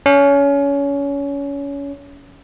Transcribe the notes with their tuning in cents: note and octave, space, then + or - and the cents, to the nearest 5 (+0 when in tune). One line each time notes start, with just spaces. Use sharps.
C#4 +25